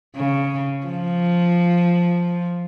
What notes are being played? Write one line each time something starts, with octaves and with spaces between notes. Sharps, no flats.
C#3
F3